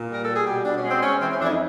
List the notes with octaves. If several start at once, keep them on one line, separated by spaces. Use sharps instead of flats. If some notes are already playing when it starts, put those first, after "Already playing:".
Already playing: A#2
G3 A#4
G3 A4
G#4
B2 G4
B2 D4
C#4
G#3
C4
G#3 C#4
E3 C4
C#4
F2 D4
E4
D#4